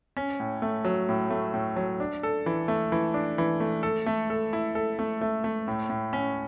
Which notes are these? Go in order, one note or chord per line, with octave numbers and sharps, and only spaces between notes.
C#4
A2
A3
F#3
A2
A3
A2
F#3
D4
A4
E3
A3
E3
D4
E3
A3
A4
A3
A4
E4
A4
A3
A3
A3
A2
A2
C#4